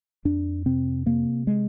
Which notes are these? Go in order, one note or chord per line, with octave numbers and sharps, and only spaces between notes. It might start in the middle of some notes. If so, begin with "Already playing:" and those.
F2 D4
C3 C4
C3 A#3
G#3